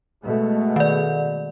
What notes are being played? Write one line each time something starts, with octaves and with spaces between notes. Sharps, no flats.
B2 G#3 A3
D#3 D5